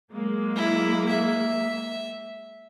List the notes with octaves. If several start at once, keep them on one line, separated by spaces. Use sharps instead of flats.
F#3 G#3 A#3
E4
E5